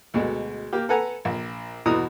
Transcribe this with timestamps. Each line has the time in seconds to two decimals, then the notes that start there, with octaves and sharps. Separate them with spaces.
0.14 D2 B2 G#3
0.73 A#3 G4
0.89 A4 B4 F#5 G#5 A#5
1.25 A#1
1.86 E2 B2 E3 F#4 A#5 D#6